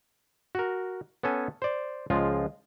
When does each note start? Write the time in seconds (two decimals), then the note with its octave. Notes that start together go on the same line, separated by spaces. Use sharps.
0.55 F#4 A#4
1.23 B3 C#4 A4 G#5
1.62 C5 D5
2.10 C#2 F3 G#3 F4